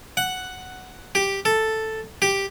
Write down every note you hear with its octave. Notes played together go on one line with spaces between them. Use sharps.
F#5
G4
A4
G4